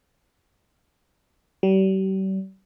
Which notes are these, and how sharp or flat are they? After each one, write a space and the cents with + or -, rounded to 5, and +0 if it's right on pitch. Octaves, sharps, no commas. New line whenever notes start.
G3 -40